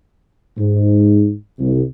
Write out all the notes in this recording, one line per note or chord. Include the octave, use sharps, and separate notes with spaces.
G#2
C2